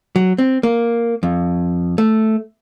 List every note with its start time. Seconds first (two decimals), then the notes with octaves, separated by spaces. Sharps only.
0.16 F#3
0.38 C4
0.63 A#3
1.23 F2
1.98 A3